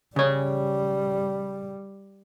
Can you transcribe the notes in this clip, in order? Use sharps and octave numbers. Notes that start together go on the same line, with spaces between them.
C#3 G3 C#5